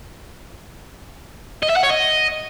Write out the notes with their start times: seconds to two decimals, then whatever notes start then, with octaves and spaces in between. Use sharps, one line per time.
1.63 D#5
1.70 E5
1.77 F#5
1.83 C#5
1.90 D#5